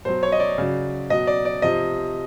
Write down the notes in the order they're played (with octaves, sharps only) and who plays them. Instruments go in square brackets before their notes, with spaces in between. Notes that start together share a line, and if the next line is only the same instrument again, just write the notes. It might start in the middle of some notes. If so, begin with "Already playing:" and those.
[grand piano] B2 F#3 C5
C#5
D#5
D5
C#3 F#3
B2 F#3 D#5
D5
D5
C3 F3 D#5